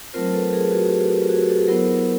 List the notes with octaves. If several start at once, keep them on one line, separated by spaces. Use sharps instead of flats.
F#3 A3 C4 F4 A#4 C5
A4 B4
G#4 A#4
F#4
G4
G4
F#4 G#4
G4 A4
F#3 B3 E4 A#4 C5